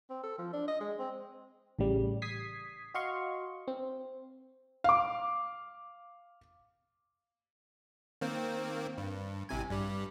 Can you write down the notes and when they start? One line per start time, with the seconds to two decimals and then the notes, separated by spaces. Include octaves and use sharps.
0.10 C4
0.23 A4
0.38 F3
0.53 D4
0.68 D#5
0.81 G#3
0.99 C4
1.79 A1 C#3 G3
2.22 D#6 G#6 B6 C7
2.94 F#4 D#5 F5 C6 C#6
3.68 C4
4.84 F5 D6
8.21 D#3 A#3 C4
8.98 G2
9.49 A1 C3 G#5
9.70 G2 G3